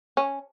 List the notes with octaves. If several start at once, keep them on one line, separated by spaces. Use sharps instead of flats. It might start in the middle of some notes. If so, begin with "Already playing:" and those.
C#4